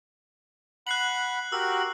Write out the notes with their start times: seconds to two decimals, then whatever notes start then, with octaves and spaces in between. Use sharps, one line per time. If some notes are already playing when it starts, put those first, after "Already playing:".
0.87 F#5 B5 F#6 C7 F#7
1.52 F#4 G4 A#4 E6